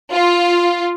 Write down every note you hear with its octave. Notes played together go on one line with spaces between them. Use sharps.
F4